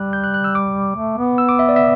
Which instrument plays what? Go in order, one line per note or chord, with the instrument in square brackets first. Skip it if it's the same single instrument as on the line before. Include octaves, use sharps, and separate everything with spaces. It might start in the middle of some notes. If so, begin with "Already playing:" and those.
Already playing: [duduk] G3 [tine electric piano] F#6
[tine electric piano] G6
F#6
F#6
E6
D6
[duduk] A3
B3
[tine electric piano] E6
D6
E5
D5
E5